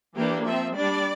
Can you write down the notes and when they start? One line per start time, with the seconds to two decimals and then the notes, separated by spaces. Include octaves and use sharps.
0.16 E3 A#3 D4 G4
0.45 F3 C4 E5
0.74 G3 D4 D5